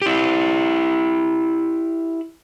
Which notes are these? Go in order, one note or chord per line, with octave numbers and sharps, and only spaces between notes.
E4 G4